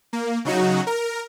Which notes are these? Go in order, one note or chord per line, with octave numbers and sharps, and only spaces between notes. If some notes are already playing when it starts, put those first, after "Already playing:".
A#3
C#3 F#3 D#4 F#4
A#4